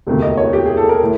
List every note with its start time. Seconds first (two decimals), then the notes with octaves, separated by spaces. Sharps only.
0.07 E1 D2 C3 D#3
0.22 D#5
0.37 C#5
0.53 G4
0.66 G#4
0.77 A4
0.89 A#4
1.02 A2